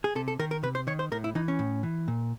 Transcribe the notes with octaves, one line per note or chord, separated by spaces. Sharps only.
G#4
C3 A4
A4
D#3 A#4
A#4
C3 B4
C5
D#3 C#5
C5
A2 A#4
E4
E3 D#4
C#4
A2
E3
A#2